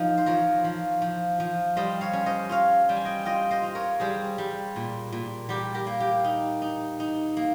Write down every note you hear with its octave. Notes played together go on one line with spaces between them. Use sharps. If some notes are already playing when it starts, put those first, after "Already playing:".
Already playing: F3 D#4
C5
F3 A#4 C#5
F3
F3
F3
G3 C5 D#5
C#5 F5
C#4
C5 D#5
F4 C#5 F5
G3 G5
G#5
D#5 G5
F4 D#5 G5
C5 D#5
F4
A#4 C#5
G3 G#4 C5
G3
A#2
A#2
G3 G4 A#4
G4 A#4
A#3
G4
D#4
D#4
D#4
A#3